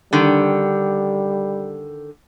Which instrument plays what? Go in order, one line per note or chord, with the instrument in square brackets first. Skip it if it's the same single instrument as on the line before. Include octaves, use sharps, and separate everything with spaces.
[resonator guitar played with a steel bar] D3 D#3 [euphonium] G3